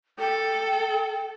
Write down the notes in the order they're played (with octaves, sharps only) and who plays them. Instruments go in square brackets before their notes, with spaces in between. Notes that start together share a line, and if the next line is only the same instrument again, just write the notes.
[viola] A4 [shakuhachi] G5